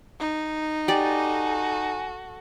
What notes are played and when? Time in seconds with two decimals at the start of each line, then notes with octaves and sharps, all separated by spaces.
0.20 D#4
0.88 F#4 G4 A4 D5 G#5